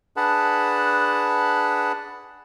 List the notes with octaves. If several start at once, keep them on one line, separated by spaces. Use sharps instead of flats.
D4 G#4 B4 F#5 A5 B5